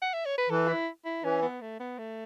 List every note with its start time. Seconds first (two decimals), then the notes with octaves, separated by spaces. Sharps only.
0.02 F#5
0.14 E5
0.26 C#5
0.38 B4
0.50 E3 A4
0.68 E4
1.05 E4
1.24 E3 C#4
1.43 B3
1.61 A3
1.80 B3
1.98 A3